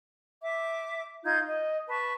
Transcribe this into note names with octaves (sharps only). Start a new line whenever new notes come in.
E5 D6
D#4 F4 G6 G#6
D#5
B4 A5 C#6